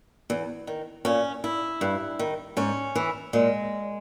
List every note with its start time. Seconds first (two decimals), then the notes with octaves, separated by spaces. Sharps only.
0.30 E2
0.67 D#3
1.05 A#2 C#4
1.44 E4
1.81 G2
2.19 D#3
2.57 G#2 C#4
2.95 E3
3.33 A#2 G#3